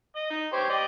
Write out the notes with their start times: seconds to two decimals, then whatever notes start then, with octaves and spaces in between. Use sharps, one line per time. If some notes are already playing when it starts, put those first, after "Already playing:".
0.16 D#5
0.30 D#4
0.53 G4 C5 C#5
0.69 G4 D5 D#5